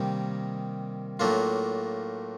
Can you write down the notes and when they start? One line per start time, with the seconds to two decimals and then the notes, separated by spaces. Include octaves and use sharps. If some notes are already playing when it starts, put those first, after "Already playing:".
Already playing: C3 D#3 G3 A#3 D#4
1.20 A2 F#3 A#3 D4 F4